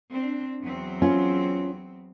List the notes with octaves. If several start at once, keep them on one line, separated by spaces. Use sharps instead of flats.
C4 D4
E2 F#3 C4
C#4 F4